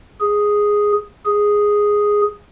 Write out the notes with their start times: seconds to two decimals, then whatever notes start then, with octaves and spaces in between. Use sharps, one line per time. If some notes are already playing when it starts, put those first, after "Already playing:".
0.21 G#4
1.26 G#4